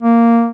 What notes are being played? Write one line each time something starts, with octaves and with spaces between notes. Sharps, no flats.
A#3